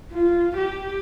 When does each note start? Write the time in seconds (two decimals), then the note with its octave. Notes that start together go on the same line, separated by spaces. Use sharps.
0.12 F4
0.57 G4